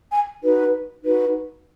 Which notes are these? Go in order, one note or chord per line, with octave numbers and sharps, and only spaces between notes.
G#5
D#4 F#4 B4
D#4 F#4 B4